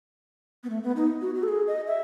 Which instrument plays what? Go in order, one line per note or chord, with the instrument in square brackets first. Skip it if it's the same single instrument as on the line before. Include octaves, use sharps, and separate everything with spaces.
[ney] B3
A3
B3
D#4
F#4
F#4
A4
G#4
D#5
E5